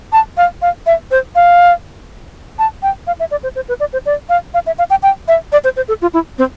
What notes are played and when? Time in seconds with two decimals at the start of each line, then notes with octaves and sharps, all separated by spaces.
0.13 A5
0.37 F5
0.62 F5
0.86 E5
1.11 C5
1.35 F5
2.59 A5
2.83 G5
3.07 F5
3.20 E5
3.31 D5
3.43 C5
3.55 C5
3.68 B4
3.80 D5
3.93 C5
4.06 D5
4.29 F5
4.54 F5
4.66 E5
4.79 F5
4.90 G5
5.03 G5
5.28 E5
5.52 D5
5.64 C5
5.76 C5
5.88 A4
6.02 F4
6.13 E4
6.38 C4